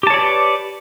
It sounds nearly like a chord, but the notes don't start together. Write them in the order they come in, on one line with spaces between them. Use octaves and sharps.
G4 A5 C#5 D5 B4